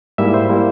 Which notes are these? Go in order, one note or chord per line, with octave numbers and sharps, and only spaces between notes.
G#2 G3 A#3 E4 E5
C5
G3 A#3 E4